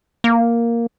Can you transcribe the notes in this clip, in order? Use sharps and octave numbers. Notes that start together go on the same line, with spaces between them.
A#3